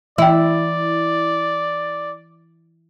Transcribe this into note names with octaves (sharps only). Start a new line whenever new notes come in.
E3 E4 D5 G5